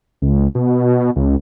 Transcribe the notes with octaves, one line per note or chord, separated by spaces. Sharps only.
C#2
B2
C#2